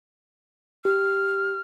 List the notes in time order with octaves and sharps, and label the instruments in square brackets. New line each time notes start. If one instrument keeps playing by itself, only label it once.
[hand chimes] G4 [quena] F6